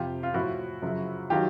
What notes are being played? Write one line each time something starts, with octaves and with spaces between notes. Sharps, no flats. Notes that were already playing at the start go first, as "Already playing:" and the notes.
Already playing: F2 C3 F3 F4 G4
F4
A2 F3 E4 F#4
F#2 C#3 F3
D#3 F#3 F4 G4